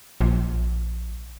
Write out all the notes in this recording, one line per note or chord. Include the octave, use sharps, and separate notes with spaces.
A#1